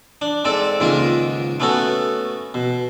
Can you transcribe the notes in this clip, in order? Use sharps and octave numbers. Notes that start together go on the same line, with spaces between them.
D4
G#2 C4 A4 D5
C#2 G#2 D#3 A#3 F4 A#4
A3 B3 C#4 F#4 A4
B2